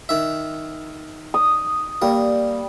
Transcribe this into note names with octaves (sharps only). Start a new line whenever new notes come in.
D#3 E5
D#6
G3 A#3